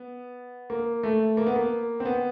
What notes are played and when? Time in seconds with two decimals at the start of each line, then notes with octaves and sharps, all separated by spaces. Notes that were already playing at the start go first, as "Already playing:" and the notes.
Already playing: B3
0.70 A#3
1.03 A3
1.37 A#3
1.47 B3
1.56 A#3
2.00 C4
2.05 B3